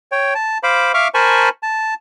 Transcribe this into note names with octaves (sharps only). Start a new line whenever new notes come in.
C#5 G5
A5
C5 F5 B5 D6
E5 F5 C#6 D6 F6
A#4 C5 G#5 A5 B5 C#6
A5